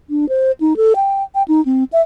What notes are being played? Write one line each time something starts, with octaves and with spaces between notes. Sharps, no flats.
D4
C5
D#4
A4
G5
G5
D#4
C4
E5